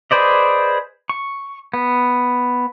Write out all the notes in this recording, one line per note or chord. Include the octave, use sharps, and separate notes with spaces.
G#4 B4 C5 D5 D#5
C#6
B3